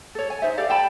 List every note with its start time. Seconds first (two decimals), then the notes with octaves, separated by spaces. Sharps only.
0.15 A4 C#5
0.30 G#5
0.42 D#4 C5 E5
0.57 G4 A4 D5 F5
0.70 G5 A5 B5